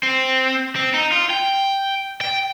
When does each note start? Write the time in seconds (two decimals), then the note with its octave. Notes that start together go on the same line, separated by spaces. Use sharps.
0.03 C4
0.76 C4
0.94 D#4
1.12 F4
1.30 G5
2.21 G5